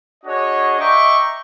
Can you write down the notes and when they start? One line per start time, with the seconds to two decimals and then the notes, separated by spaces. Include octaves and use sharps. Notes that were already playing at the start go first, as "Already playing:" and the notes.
0.24 D4 F#4 G#4 C#5 D#5
0.79 D#5 E5 G5 A#5 C#6 D6